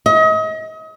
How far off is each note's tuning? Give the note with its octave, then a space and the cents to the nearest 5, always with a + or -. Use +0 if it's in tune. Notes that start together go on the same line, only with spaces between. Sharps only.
D#5 +35